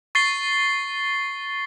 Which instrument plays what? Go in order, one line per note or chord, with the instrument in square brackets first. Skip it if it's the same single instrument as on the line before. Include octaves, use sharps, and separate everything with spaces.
[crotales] C#6 A6 C7 G7